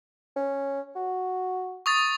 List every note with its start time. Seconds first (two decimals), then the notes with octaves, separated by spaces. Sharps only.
0.36 C#4
0.96 F#4
1.86 C#6 D#6 A6